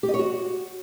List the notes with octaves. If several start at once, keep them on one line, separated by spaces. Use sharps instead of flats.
G4
D#5
C#5
F#4